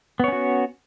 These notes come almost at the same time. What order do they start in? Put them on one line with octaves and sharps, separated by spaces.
B3 C#5 C#4 F#4